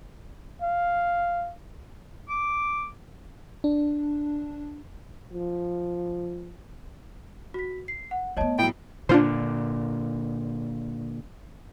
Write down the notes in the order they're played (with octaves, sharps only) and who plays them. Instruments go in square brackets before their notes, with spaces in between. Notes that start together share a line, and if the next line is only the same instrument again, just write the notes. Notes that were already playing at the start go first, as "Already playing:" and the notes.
[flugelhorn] F5
[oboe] D6
[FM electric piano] D4
[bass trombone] F3
[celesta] F#4 B6
C7
F#5
[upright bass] A3 B3 [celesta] C#5 D#5 A5
[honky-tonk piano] A2 F#3 [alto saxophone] G5 [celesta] B5
[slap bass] A#2 D3 [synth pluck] D4 F4 C5